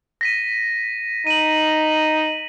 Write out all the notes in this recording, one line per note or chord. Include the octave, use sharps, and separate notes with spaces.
A#6 B6 D#7
D#4 D#7 F#7